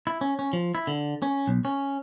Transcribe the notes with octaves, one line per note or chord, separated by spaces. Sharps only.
E4
C#4
C#4
F3
E4
D3
C#4
B1
C#4